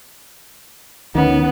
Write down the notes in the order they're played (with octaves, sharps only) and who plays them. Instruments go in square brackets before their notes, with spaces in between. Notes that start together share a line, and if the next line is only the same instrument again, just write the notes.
[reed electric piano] D2 C#4 [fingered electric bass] D#3 [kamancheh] B3